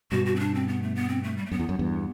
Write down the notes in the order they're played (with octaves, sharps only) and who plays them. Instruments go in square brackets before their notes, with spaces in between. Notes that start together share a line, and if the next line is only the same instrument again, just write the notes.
[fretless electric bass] G2 B2 [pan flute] F#4
[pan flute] F#4
C4
D4
C4
B3
A3
B3
C4
A3
G3
A3
[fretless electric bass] F#2 [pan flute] B3
[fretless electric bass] E2
F#2
E2 G2